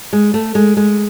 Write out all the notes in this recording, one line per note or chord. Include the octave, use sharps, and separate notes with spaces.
G#3
A3
G#3
G#3